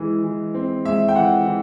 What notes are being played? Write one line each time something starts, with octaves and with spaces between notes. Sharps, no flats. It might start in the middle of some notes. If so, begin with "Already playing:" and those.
Already playing: E3 G#3
E3
C4
G#3 E5
G5
E3 F#5
E3